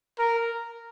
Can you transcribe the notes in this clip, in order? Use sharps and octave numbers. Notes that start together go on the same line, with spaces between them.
A#4